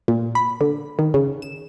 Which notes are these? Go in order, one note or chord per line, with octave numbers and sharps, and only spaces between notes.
A#2
B5
D3
D#3
C#3
E7